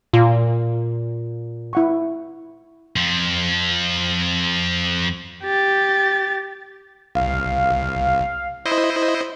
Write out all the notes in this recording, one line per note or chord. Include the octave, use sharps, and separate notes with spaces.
A#2 F4
E4 F#5 C#6
F2 F3
G4 A6
C2 F5
E4 C5 D#5